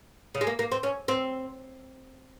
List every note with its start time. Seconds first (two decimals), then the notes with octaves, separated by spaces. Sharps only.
0.35 C#3
0.41 G#3
0.47 A#3
0.59 A#3
0.72 C4
0.83 C#4
1.08 C4